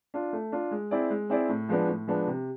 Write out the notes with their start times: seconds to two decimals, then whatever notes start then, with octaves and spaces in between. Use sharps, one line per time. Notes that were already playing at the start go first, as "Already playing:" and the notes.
0.14 D4 F4
0.33 A3
0.52 D4 F4
0.71 G#3
0.91 C4 E4 G#4 D5
1.10 G#3
1.30 C4 E4 G#4 D5
1.49 A2
1.69 F3 G#3 B3 D4
1.88 A2
2.07 F3 G#3 B3 D4
2.27 C3